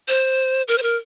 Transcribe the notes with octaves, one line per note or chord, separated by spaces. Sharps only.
C5
A#4
C5
A#4